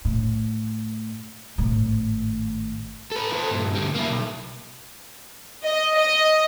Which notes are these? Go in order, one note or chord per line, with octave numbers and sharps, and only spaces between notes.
A2
G#1 A2
A4 B4
A4 C5
G2 A#2
D2 G3
A#3 E4
B1
D#5
D#5